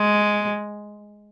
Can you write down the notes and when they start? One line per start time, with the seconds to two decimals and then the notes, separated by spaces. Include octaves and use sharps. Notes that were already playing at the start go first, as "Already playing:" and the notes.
Already playing: G#3